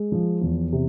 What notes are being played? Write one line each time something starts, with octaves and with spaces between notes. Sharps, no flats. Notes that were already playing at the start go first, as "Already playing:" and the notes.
Already playing: G#3
F3
E2
C3